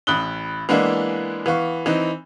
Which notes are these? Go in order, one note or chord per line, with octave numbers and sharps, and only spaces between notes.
A1 B5 D#6 F#6 G7
E3 G#3 A#3 B3 D4 E4
E3 B3 F5 C#6
E3 C4 D#4